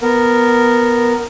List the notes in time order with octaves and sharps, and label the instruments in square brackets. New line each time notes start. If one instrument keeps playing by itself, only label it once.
[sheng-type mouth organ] B3 A#4